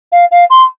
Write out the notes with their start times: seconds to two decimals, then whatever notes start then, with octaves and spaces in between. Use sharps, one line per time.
0.12 F5
0.31 F5
0.50 C6